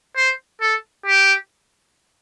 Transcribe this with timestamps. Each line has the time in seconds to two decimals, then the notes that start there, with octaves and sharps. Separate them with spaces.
0.16 C5
0.61 A4
1.06 G4